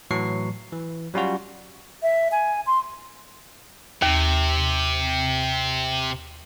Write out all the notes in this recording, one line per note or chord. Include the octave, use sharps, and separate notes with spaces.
A2 E3 F#3 C#6 C7
E3
F#3 G3 C#4 F4 F#4
E5
G#5
C6
D#2 C3